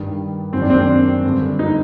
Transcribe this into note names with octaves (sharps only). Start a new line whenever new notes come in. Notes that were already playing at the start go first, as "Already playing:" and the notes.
Already playing: G2 D#3
F#2 D#3 C4
D4
C4
D4
G2 D3
D#4